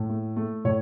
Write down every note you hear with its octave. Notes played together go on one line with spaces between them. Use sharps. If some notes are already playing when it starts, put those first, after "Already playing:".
Already playing: A2
A3
A3
A2 C#5